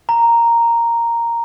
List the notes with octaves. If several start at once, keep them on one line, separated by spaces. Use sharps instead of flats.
A#5